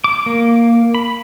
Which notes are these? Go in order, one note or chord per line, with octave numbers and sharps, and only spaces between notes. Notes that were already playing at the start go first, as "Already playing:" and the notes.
D6
A#3
B5